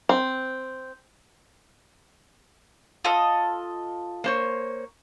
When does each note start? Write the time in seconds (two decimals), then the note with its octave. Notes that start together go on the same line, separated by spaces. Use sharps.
0.09 C4
3.05 F4 A4 D#5
4.24 A#3 C5 C#5